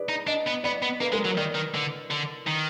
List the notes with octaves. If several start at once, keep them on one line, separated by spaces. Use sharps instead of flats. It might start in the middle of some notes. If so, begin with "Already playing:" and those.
Already playing: G#4 B4 D5
D#4
D4 D#5
B3
B3 D5
B3
A#3 B4
G#3 A#4
F#3
D#3 D5
D#3
D3
D3
D#3